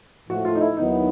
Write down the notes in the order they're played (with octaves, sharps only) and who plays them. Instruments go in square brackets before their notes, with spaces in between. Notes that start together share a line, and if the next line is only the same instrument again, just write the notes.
[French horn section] A2 F3 A3 [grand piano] F#4
[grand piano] F4
D#4
E4
[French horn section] D#2 D#3 F#3 B3 E4 [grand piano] D#4